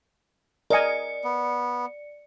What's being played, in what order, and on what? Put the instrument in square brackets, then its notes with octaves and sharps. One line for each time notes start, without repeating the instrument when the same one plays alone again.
[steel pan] A#4 D#5 G#5 [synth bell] D5 C#7
[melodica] B3